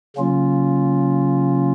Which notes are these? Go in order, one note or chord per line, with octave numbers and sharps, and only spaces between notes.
C#3 F#3 A#3 C#4 F4